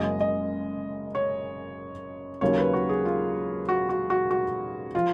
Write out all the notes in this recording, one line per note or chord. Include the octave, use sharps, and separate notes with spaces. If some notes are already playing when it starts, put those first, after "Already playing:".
Already playing: F#1 F#2 C#3 G#3 D#5
D#5
C#5
D#2 C#3 F#3 A#3 C#5
B4
F#4
G#4
F4
F#4
F#4
F#4
F#4
F3 F4